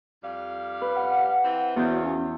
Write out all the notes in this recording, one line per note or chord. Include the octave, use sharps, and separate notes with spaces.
F2 G3 F5
B4
F#5
E3 C4
E2 C#3 F3 F#4 G6
C#4